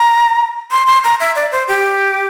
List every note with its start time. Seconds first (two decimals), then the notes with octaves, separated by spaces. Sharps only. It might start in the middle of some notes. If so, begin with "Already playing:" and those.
Already playing: A#5
0.71 C6
0.87 C6
1.04 A#5
1.20 E5
1.35 D5
1.52 C5
1.68 G4